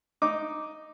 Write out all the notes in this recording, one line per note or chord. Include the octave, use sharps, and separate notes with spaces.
D#4 D6